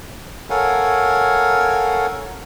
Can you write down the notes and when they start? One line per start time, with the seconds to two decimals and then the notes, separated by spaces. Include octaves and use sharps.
0.50 A4 A#4 C#5 F5 F#5 G#5